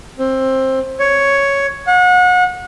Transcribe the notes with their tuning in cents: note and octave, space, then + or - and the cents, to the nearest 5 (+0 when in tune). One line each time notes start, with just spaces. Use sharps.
C4 +15
C#5 +5
F#5 -35